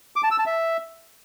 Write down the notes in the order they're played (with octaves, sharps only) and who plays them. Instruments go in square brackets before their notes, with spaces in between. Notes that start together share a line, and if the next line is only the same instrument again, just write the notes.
[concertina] D6
A5
E6
A5
E5